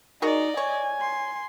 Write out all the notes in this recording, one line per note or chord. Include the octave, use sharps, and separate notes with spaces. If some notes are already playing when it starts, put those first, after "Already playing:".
D#4 F#4 G#4 A#4 D5 D#5
C#5 G#5
C6